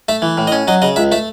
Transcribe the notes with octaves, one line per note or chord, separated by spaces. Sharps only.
A3 E5
E3
A2
D#5
C#4
F#3 D#5
C#3 D#5
C#2 E5
A3 E5